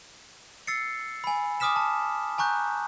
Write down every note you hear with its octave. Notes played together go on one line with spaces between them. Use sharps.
E6 A6 C7 C#7
G#5 B5
G#5 D6 D#6 F6 B6 E7
A5
G#5 A#5 C#6 F#6 G6